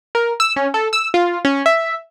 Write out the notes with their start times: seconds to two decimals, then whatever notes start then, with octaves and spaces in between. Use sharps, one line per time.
0.15 A#4
0.40 E6
0.56 C#4
0.74 A4
0.93 E6
1.14 F4
1.45 C#4
1.66 E5